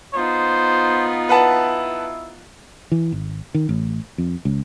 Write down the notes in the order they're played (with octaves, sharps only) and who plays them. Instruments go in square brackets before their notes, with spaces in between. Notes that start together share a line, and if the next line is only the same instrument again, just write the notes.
[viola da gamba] B3 D#4 F4 [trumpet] C5
[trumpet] E4 [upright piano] B4 F#5 A5
[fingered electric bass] E3
G#1
D#3
A1
F2
C#2